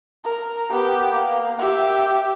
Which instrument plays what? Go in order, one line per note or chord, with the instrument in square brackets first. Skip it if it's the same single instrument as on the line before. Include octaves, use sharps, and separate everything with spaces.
[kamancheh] A#4
B3 G4
A#3
G4 E5